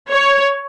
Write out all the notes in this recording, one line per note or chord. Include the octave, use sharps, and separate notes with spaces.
C#5